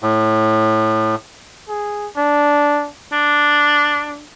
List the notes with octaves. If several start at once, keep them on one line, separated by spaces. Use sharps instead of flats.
A2
G#4
D4
D4